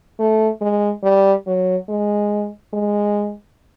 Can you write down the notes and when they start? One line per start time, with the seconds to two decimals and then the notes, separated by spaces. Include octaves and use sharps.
0.19 A3
0.61 G#3
1.03 G3
1.47 F#3
1.89 G#3
2.73 G#3